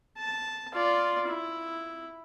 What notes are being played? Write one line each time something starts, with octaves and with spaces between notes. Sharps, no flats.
A5
F4 D5
E4